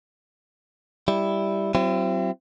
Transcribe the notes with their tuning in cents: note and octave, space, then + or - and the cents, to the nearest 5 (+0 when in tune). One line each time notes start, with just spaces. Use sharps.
G3 +0 E4 +0
F#3 +40 C4 +0 E4 +40